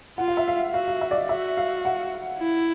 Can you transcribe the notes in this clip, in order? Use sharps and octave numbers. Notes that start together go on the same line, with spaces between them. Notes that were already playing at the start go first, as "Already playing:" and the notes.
F4 F#5
F5
E5
F5
F#4 F5
F5
E5
D5
D#5
F#4 E5
F5
F#5
E4